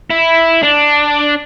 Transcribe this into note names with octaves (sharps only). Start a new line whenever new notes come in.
E4
D4